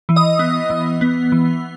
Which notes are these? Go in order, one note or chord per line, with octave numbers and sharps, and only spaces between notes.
E3
D#5 D#6
B3
E3
B3
E3